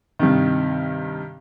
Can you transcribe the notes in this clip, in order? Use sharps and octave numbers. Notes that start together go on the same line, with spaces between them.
G2 C3 D#3